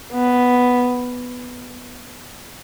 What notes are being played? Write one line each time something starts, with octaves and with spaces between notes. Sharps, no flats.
B3